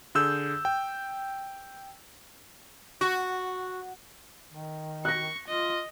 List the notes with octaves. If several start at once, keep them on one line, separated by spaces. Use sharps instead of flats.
D3 G#4 E6 G6
G5
F#4
D#3
C#6 F#6 A#6
F4 D#5